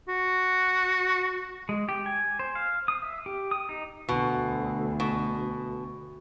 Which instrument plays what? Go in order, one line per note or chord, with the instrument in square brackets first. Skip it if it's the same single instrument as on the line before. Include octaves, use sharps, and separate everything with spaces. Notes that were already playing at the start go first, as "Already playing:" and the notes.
[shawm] F#4
[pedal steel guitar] G#3
G4
G#5
C5
F5
D#6
E5
G4
D#6
D#4
[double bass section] D2 [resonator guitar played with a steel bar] B2
[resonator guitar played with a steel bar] B2